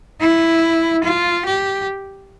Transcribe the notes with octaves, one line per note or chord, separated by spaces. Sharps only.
E4
F4
G4